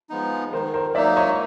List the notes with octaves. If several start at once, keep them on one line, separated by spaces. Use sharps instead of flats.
F3 G#3 B3 D#4
D#3 A#4 C5
A#4 C5
F#3 A#3 D#4 D5 E5
C#5 D#5